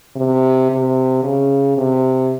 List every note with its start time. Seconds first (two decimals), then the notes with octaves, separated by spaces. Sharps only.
0.16 C3
0.70 C3
1.24 C#3
1.78 C3